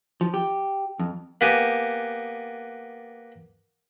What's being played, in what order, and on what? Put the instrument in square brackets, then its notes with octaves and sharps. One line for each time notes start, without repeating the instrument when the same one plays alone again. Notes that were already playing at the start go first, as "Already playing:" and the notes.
[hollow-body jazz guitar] F3
G4
F2
[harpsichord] A#3 B3 G4 G#5